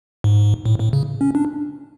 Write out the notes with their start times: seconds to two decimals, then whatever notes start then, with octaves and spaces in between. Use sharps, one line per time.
0.24 G#2
0.65 A2
0.80 A2
0.93 C#3
1.21 C#4
1.35 D4